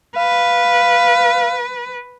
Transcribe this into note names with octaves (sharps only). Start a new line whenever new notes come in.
B4 F5